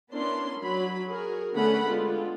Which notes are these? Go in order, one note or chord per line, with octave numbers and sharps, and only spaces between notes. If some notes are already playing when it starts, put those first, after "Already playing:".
B3 C#4 D4 E4 A#4 C6
F#3 B5
F#4 G#4 A#4
D3 A3 B3 C#4 F#5 B5
D3 G#3 B3 F4